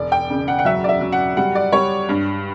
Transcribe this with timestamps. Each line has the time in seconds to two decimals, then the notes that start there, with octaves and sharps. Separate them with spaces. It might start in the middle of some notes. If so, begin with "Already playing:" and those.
Already playing: E1 D5
0.12 G5
0.30 C#3
0.48 F#5
0.59 F#5
0.65 F#3 E5
0.84 D5
0.89 E5
1.01 F#3
1.12 F#5
1.37 G3 F#5
1.55 D5
1.72 G3 C#5
2.09 G2